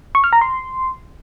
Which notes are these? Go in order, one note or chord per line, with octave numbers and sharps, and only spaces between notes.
C#6
F6
A#5
C6